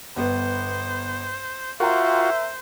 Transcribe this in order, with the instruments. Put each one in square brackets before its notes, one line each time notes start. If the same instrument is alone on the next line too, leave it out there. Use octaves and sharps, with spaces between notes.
[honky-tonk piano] G1 B3 [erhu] C5
[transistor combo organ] F4 F#4 [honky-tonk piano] A#4 G5 A#5 [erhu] C5 [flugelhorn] E5